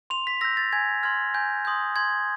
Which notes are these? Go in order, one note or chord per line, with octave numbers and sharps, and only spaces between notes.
C6 F7
B6
E6 G6 A#6
A6
G#5 G#6
C6 F6 G#6
G#5 G6
C6 D#6 G6
C6 G#6